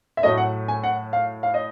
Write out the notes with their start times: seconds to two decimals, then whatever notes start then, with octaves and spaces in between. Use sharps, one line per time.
0.17 E5
0.23 A2 F#3 A3 D#5
0.38 F#5
0.68 G#5
0.84 F#5
1.13 F5
1.43 F5
1.54 D#5